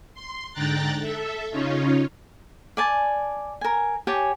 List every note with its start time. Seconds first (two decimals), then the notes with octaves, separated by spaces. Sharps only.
0.14 C6
0.53 G#2 D3 G5 A#5 F#6 A6
1.01 A4 E5
1.51 C#3 C#4 D#4 F4 C#5
2.77 D5 G#5 A5
3.61 A#4 G#5
4.07 G4 C#5 G#5 A5